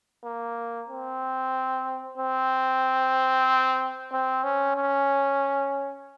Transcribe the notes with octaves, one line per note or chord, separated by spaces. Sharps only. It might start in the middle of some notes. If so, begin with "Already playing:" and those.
A#3
C4
C4
C4
C#4
C#4